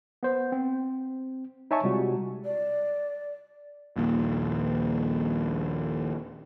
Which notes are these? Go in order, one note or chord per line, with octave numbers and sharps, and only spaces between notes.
B3 C5
C4
D#4 C#5 E5 G#5 A5 C#6
C3 G3 G#3 F4 F#4
D5
A#1 D#2 A#2